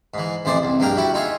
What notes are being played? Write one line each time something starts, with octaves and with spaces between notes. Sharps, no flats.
G#2 E3
A1 F2 E3 C5 D5
C2
A#1 G2 A#3 A#4 G5
G3 E4 F#4
D#4 F4 G#4 E5